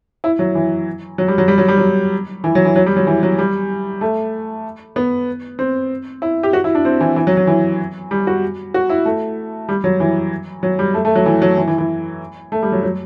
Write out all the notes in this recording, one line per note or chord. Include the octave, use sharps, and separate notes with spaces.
E4
F#3
E3
F#3
G3
F#3
G3
F#3
G3
F#3
E3
F#3
E3
F#3
G3
F#3
E3
F#3
G3
A3
B3
C4
E4
G4
F#4
E4
D4
C4
E3
E3
F#3
F#3
E3
G3
F#4
F#4
E4
A3
G3
F#3
E3
F#3
G3
A3
A3
F#3
E3
F#3
E3
E3
E3
A3
G3
F#3
F#3